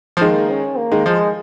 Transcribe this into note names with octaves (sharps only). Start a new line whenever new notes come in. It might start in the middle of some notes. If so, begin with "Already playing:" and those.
F3
D#3 G#3 A#3
C#4
A#3
D#3 G#3
F3 G#3